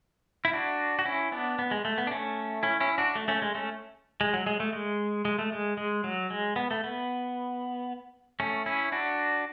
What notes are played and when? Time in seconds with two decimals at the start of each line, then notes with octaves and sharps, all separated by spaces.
0.45 E4
0.53 D4 F#4
0.99 F#4
1.05 C#4 E4
1.32 B3 D4
1.59 B3
1.71 G#3
1.85 A3
1.98 B3
2.07 D4
2.11 A3 C#4
2.63 C#4 E4
2.80 C#4 E4
2.98 D4 F#4
3.15 A3
3.28 A3 C#4
3.42 G#3
3.55 A3 C#4
4.21 G#3
4.34 F#3
4.47 G#3
4.60 A3
4.73 G#3
5.25 G#3
5.39 A3
5.52 G#3
5.77 G#3
6.04 F#3
6.30 G#3
6.56 B3
6.71 A3
6.84 B3
8.40 A3 C#4
8.66 C#4 E4
8.92 D4 F#4